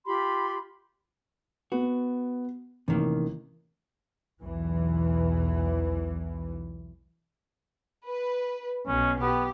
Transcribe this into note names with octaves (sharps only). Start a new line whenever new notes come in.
F4 G4 B5 C6
B3 F#4
A1 C3 D#3 A#3
B1 E2 E3
B4
B1 B2 C#4
B3 G4